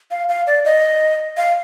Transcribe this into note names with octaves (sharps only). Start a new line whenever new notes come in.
F5
F5
D5
D#5
F5